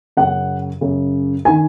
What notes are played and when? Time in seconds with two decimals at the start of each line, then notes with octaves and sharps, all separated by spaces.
0.17 F#2 C#3 F#5
0.81 F#2 C#3
1.45 D#3 G#5